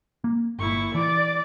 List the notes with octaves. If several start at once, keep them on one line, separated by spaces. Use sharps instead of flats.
A#3
G1 A#2 E4 C#6
E3 D5 D6 A6